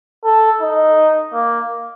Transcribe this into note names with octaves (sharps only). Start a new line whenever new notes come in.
A4
D#4
A#3